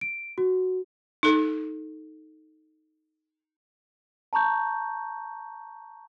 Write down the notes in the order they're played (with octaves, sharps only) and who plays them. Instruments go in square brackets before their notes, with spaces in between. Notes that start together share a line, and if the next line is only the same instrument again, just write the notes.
[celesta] D7
F#4
[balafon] D#4 A4
[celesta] A5 A#5 C#6 G6